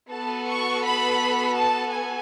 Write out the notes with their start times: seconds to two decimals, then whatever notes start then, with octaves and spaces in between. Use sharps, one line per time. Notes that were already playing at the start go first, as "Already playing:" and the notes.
0.12 B3 F#4 A4 A5
0.48 C#6
0.84 B5
1.56 A5
1.92 G#5